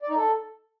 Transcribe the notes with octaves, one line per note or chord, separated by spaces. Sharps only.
D5
D#4
A4